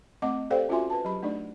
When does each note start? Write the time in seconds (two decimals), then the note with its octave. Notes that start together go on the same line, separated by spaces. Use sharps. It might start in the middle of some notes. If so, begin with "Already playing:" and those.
0.22 A3 C4 D#5 F#5 D6
0.50 G4 A4 C5 D5 F5 G5
0.69 C#4 F4 F#4 E5 G#5 C6
0.90 B4 A5
1.05 F#3 G4 B5
1.23 A3 D4 D#4 D5